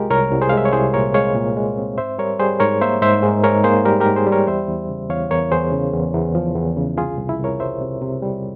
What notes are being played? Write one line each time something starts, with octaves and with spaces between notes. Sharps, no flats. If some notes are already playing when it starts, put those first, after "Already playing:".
Already playing: C2 G#3 F4 G4 A#4
C2 A#4 C#5
C2
G#4 C5
F5
G#3 E5
C#5
C2 G#4 C5
A#2 A#4 C#5
G#3 C#5 F5
A#2
G#3
C4
G#2 C5 E5
G3 A#4 C#5
G3 G#4 C5
G#2 A#4 C#5
A#3 C5 E5
G#2 C5 E5
G#2
G#2 A#4 C#5
A#3 G#4 C5
G3 G4 A#4
G#2 G4 A#4
G#4 C5
G3
A#4 C#5
E2 C5 E5
E2
C#3
E2 C#5 F5
E2 A#4 C#5
E2 G#4 C5
C#3
E2
E2
F3
E2
C#3
C2 F4 G#4
C2
E4
C2
A#4 C#5
G3 C5 E5
C3
C3
G3